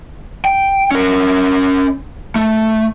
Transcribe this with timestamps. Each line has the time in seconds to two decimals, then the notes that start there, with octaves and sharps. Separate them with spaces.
0.45 G5
0.91 C#4 A#4
2.36 A3